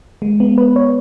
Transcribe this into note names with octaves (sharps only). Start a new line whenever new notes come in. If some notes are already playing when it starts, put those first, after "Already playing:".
G#3
B3
B4
C#5